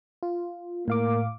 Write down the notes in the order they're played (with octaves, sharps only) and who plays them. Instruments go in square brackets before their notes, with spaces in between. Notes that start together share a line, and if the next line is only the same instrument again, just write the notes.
[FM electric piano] F4
[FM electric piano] A2 F5 D6 [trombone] A#3